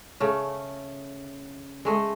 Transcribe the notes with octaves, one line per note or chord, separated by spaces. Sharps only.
C#3 A3
G#3 A3 D#5